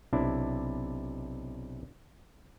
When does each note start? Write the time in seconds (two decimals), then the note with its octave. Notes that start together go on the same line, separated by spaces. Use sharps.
0.13 B1 C3 D4 E4